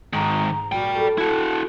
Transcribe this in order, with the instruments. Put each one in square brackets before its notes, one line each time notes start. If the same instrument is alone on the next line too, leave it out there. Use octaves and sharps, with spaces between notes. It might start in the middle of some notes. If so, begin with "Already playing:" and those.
[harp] G#2 [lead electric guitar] D#3 G#3 [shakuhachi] A#5
[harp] A#1 F6 [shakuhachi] F#4 [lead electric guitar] D5 G5
[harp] A4 B4
[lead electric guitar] E4 F#4 [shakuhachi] A5